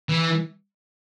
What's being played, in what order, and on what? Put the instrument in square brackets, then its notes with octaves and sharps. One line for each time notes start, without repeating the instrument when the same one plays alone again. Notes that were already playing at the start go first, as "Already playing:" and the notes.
[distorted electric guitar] E3